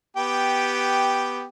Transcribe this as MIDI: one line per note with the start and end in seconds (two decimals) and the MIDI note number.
0.17 1.44 59
0.17 1.44 67
0.17 1.44 79